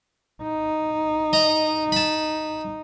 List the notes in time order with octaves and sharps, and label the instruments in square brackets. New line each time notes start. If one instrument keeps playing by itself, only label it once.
[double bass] D#4
[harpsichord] D#5 A#5
A5 B5